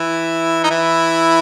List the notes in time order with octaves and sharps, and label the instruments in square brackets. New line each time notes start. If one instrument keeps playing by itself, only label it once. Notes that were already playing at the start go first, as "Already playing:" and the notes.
Already playing: [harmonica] E3 E4
D#4
E3 E4